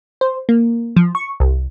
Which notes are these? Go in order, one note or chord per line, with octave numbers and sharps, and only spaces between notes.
C5
A#3
F3
C#6
C2